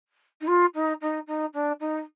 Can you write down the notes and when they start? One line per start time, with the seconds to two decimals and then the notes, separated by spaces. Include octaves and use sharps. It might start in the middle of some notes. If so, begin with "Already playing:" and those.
0.41 D#4
0.47 F4
0.74 D#4
1.01 D#4
1.27 D#4
1.54 D4
1.80 D#4